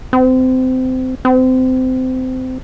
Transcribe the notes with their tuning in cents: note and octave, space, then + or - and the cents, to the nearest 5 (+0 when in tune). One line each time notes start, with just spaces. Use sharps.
C4 -25
C4 -25